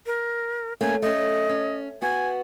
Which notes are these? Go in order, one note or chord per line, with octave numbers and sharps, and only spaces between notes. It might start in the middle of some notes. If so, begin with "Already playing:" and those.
A#4
A3 A#3 C#4 G#5
A3 C#4 D#5
C#4
B3 F#4 G#5